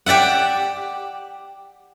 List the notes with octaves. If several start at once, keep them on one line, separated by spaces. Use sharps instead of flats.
G4 D5 E5 F#5